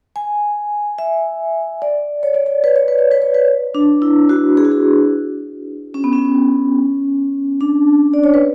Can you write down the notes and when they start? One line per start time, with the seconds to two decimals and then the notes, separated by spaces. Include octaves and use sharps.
0.16 G#5
0.98 E5
1.82 D5
2.23 C#5
2.34 D5
2.46 C#5
2.64 B4
2.76 C#5
2.88 B4
2.99 C#5
3.11 B4
3.22 C#5
3.34 B4
3.75 D4
4.02 E4
4.29 F#4
4.57 G#4
4.65 F#4
4.72 G#4
5.94 C#4
6.04 B3
6.13 C#4
7.61 D4
8.14 D5
8.24 C#5
8.34 B4